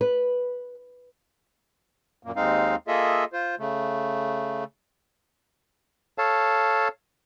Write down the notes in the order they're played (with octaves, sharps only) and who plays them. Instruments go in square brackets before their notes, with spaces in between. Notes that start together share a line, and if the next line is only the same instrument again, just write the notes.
[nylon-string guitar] B4
[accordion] F#2 A#2 A#3
D#2 G#3 C4 D#4 F5
A#3 F4 G#4 A4 D#5 E5
F4 C5
C#3 A3
[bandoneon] A4 C#5 F5 A5